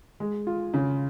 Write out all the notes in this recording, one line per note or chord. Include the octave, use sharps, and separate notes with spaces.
G#3
F4
C#3